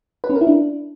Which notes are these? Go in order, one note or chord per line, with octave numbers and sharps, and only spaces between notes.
B4
C#4
A#4
E4
D4